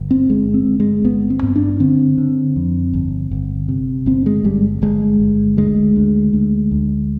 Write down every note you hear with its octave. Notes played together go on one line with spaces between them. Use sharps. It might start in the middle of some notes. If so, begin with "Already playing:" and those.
Already playing: G1
C4
G1 G#3
C4
G1
G#3
G1 B3
C4
G2
D4
D3 C4
D3
F2
G1
G1
C3
G1 C4
G#3
G1 G3
G1 G#3
G1
D2 G#3
D2
D2
D2